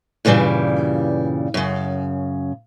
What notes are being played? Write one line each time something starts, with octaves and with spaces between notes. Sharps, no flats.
G2 A#2 C#3 E3 G3
F#2 C#3